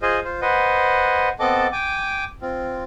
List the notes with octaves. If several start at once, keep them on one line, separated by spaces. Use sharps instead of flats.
F4 G#4 C5 D#5 G#5
F4 C5
B4 C5 D#5 F#5 G#5
B3 C4 A4 D#5 A5 D6
G5 G#5 D6
C4 F4